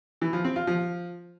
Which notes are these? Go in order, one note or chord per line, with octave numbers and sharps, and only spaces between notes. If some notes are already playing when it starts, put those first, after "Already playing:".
E3
F3
C4
F4
F3